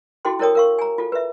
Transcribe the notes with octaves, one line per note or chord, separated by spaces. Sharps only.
E4 F#4 G#4 A4 G5 C6
E4 A4 A#4 C#5 G5 D#6
A#4 F5 C#6
G#5 A#5
F4 A4
B4 E5